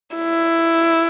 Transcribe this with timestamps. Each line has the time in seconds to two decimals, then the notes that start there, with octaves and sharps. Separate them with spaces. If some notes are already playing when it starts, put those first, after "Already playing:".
0.16 E4